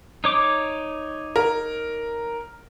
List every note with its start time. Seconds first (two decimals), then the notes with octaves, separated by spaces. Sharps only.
0.24 D#4 C#5 D6
1.36 A#4